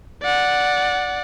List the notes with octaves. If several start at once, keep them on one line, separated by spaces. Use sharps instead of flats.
D5 F#5